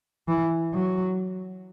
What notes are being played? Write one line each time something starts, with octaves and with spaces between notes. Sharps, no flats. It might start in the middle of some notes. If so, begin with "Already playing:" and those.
E3
F#3